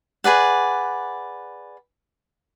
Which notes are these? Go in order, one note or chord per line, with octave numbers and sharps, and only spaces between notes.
G#4 B4 D5 F#5